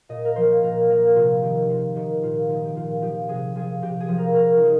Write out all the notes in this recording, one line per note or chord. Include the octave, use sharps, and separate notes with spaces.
A#2 D#5
A#4
F3 C5
A#2 A#4
F3 A#4
C3 F4
D#3 G4
C3 F4
D#3 G4
A#2 F4
F3 D#4
G4
A#2 F4
F3 G4
C3 G#4
F3 G#4
C3 G4
G#4
F3
A#4
C3 A#4
D#4
F3 F4